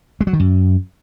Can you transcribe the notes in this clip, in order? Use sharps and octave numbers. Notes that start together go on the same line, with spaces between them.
G#3
F#3
D#3
F#2